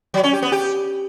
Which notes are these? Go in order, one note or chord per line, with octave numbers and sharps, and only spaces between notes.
F#3
C#4
G4
B3
G4